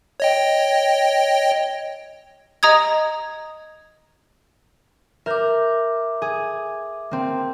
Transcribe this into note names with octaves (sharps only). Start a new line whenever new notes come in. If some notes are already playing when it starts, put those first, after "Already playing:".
C#5 D#5 G5
D#5 A#5 D#6 G#6
A#4 E5 D6 G6
G#4
A#3 C4